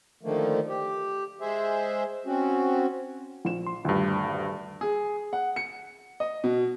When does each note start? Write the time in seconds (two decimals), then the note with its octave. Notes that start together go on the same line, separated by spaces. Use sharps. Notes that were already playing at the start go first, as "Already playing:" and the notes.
0.23 D3 D#3 F3 A3 A#3
0.69 G4
1.41 G#3 G#4 C5 E5
2.26 C4 C#4 F#4
3.45 A#1 E7
3.66 C6
3.85 D#1 D2 G2
4.81 G#4
5.33 F#5
5.56 C#7
6.20 D#5
6.44 B2